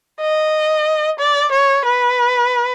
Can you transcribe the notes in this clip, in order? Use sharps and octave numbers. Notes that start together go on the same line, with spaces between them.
D#5
D5
C#5
B4